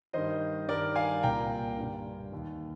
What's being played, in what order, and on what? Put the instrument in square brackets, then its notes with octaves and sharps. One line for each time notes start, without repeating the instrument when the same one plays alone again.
[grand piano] G2 D#3 C5 D#5
G2 D#3 A#4 D5
F5 G#5
C2 A#2 G5 A#5
G2 D3
D#2 D#3